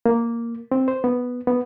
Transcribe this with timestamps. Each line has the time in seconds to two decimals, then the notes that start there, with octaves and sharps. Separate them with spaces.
0.06 A#3
0.72 C4
0.88 C5
1.04 B3
1.47 B3